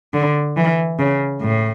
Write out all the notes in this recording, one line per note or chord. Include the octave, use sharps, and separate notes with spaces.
D3
E3
C#3
A2